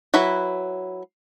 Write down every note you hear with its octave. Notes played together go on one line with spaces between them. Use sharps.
F#3 E4 B4 B5